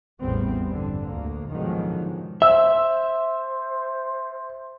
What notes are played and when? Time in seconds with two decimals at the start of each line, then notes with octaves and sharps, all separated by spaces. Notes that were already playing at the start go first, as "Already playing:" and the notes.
0.20 A1 E2 A2 G3 B3 C4
0.67 G2 D3
1.06 D2 A#3
1.50 G#2 B2 D3 D#3 F3 F#3
2.42 C5 E5 E6